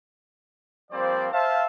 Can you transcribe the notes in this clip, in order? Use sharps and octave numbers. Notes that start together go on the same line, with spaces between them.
F3 G3 A#3 C4 C5 D5
C5 E5 F5 A5